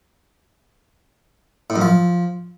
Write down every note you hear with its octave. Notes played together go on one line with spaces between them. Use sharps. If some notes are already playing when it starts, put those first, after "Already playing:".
A2
F#2
F3